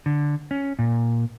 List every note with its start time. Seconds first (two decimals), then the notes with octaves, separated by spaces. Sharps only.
0.06 D3
0.51 C#4
0.79 A#2